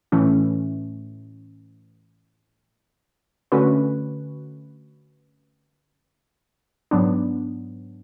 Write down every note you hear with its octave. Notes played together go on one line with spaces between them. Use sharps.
A2 E3 A3 C#4
D3 A3 C#4 F#4 B4
G#2 F#3 B3 D4